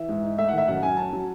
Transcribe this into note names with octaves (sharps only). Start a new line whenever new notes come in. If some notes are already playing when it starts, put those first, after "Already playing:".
Already playing: E3 E5
G#2
D#4
A3 E5
F#5
D#3 E5
F#2 F#5
F#2 G#5
C#4 A5
F#3